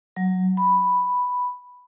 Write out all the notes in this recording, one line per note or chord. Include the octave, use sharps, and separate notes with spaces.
F#3
B5